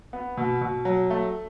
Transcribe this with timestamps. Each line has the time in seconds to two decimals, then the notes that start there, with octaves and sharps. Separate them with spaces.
0.13 B3
0.37 B2
0.61 B2
0.85 F#3
1.10 A3